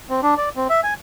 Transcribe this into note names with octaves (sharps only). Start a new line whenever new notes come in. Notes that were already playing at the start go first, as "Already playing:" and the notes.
C4
D4
D5
C4
E5
G#5